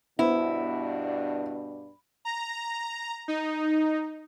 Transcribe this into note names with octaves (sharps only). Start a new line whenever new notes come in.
G2 B2 B3 D4 E4 C5
A#5
D#4